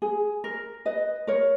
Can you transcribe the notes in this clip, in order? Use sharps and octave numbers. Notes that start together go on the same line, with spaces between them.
G#4
A#4
B4 D#5
A#4 C#5